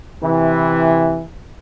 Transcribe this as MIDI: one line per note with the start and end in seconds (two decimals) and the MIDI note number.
0.23 1.22 48
0.23 1.22 52